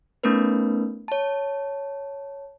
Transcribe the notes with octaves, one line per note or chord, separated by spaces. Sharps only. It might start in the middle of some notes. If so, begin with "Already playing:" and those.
A3 B3 C#4 D#4 A#4 B4
C#5 A5